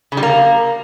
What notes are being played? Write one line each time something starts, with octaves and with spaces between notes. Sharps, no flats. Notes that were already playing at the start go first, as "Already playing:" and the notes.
C#3
G3
A#3